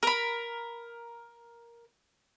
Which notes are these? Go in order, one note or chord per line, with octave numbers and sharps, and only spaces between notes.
A#4 B5